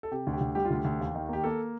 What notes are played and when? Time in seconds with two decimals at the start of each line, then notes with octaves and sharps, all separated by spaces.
0.03 A4
0.11 C3 G4
0.27 D2
0.33 G4
0.41 D2
0.55 G3 G4
0.65 F4
0.70 D2 G4
0.85 D2
1.00 D#2
1.15 D#3
1.29 A#3 G4
1.44 A#3 A4